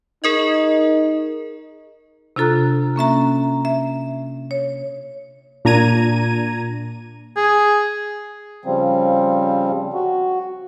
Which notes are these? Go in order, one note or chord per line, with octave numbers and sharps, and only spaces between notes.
D#4 G#4 A#4 D#5
C3 D4 F4 A4 A#5 F#6
A#3 C#4 E5 A#5
E5
C#5
A#2 D4 A#5 G#6 D#7
G#4
C#3 F3 G3 C4
F#4